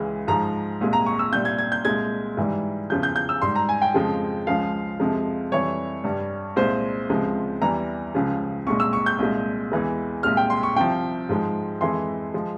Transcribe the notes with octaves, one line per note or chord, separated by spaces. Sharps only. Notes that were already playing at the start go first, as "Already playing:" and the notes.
Already playing: C#2 C#3 E3 G#3
G#2 F3 G#3 A#5
C2 A#2 G#3
A#5
C#6
E6
C2 A#2 G3 G6
G#6
G#6
G6
C2 A#2 G#3 G#6
G#2 E3 G3
E2 C#3 F3 G6
G6
G6
E6
G#2 G3 C6
A#5
G#5
G5
F2 C#3 F3 G#3
C#2 C#3 F3 G#3 F5
F2 C3 F3 G#3
F2 E3 G3 C#5
G2 G3
C2 A#2 G#3 C5
C#2 C3 F3 G#3
E2 E3 G3 A#5
C#2 C#3 F3
C2 A#2 G#3 C#6
E6
C#6
G6
C2 A#2 G#3
E2 E3 G#3
C2 A#2 G#3 F6
G5
C6
C#6
C2 C3 F3 G5
G#2 F3 G#3
F2 E3 G#3 C6
F3 G#3